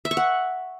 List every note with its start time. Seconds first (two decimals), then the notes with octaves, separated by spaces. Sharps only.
0.05 E5
0.11 C#6
0.17 F#5